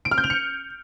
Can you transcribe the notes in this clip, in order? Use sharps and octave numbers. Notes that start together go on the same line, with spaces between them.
D7
F6
G6
F7
C#7